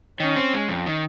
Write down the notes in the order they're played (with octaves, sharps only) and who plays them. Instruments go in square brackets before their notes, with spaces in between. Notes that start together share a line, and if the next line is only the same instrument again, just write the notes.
[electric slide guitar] D#3 [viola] C#4
[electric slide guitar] C4
G#3
F2
D#3